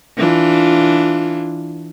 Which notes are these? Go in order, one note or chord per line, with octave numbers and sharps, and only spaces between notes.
E3 D4 F4